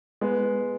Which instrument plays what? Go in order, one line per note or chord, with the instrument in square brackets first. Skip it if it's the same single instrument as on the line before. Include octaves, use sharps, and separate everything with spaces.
[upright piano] G#3 B3